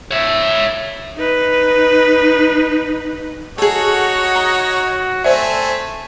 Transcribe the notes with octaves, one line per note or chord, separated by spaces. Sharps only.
C#5 E5
D#4 B4
D#4 F#4 G#4 A4 C#5 F#5
D#5 A#5
A3 C4 A4 C5 D5 E5 G#5